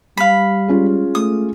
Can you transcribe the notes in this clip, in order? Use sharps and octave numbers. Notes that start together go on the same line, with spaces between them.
G3 F5 B5
G#3 C#4 F4
A3 D#6